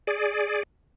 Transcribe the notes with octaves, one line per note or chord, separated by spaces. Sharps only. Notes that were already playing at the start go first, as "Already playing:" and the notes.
G#4 D5